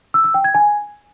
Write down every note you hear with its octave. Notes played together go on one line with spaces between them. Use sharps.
E6
E6
G5
G#6
G#5